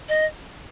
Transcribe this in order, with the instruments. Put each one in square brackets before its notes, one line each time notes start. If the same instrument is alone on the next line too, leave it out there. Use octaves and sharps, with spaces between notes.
[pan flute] D#5